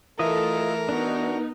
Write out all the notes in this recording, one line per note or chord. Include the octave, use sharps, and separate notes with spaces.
E3 A3 F4 A4 A#4 D#5 E5
B3 D4 D#4 F#4